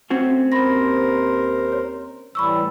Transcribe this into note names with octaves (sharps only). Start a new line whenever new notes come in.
A3 C4 C#4 F#4
D#2 A#4 C5 B5 C6 A#6
C#5
A2 E3 G3 B5 C#6 E6